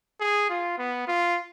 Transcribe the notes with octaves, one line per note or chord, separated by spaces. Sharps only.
G#4
F4
B3
F4